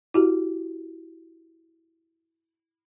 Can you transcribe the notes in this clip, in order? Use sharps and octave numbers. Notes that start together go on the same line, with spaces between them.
E4 F#4 G4